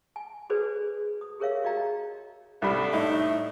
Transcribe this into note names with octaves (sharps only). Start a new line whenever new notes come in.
G#5
F#4 G#4 A4 B4 C5 D5
D#6
G4 G#4 A#4 C#5 E5 F5
F#4 D5 D#5 F5 G5 A#5
C2 G3 A3 D4 B5
A2 D#4 E5